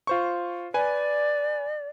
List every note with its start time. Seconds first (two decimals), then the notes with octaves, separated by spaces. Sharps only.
0.07 F4 C5 C#6
0.74 B4 D5 G#5